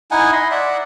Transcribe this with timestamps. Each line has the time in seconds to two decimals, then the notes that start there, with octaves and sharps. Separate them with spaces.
0.11 D#4 E4 F#5 G#5
0.32 D#5 B5 C6
0.51 D5 E5 F#5